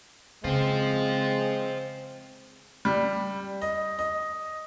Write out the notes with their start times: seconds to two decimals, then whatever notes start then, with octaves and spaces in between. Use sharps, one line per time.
0.44 C#3 G#3 C4 C5 F5
2.85 G3
3.62 D#5
3.99 D#5